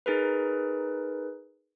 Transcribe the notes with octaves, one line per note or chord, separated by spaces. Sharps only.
D#4 G#4 A#4 B4